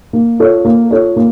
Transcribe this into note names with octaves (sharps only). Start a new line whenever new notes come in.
A#3
F4 A4 C#5
A#3
F4 A4 C#5
A#3